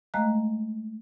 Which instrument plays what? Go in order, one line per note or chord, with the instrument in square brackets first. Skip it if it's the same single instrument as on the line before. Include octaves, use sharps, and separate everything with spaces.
[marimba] G#3 A3 D#5 F5 A#5 F#6